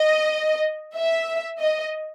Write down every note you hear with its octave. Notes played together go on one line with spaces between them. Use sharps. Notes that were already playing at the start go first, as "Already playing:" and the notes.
Already playing: D#5
E5
D#5